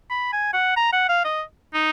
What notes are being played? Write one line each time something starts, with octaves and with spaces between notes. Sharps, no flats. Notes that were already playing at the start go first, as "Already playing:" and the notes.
B5
G#5
F#5
A#5
F#5
F5
D#5
D#4